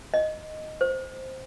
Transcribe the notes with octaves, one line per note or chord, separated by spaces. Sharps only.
D#5
C5